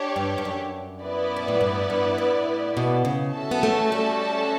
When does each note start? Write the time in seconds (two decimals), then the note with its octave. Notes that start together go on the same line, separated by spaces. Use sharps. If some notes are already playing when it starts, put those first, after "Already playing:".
Already playing: D4 G4 C#5
0.16 G2
0.38 G2
0.45 F#2
1.03 B3 E4 B4 D5
1.36 B2
1.48 A2
1.61 G2
1.90 G2
2.18 A2
2.77 B2
3.05 C#3
3.34 C#4 F#4 A4 E5 A5
3.51 B3
3.63 A3
3.92 G3